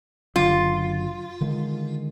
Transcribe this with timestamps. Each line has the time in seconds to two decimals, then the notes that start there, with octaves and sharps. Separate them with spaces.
0.36 F#1 D3 F#3 F4
1.41 D3 D#3 G#3